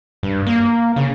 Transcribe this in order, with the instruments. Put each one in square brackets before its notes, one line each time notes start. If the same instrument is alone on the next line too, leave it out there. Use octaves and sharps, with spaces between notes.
[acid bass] G2
A#3
C#3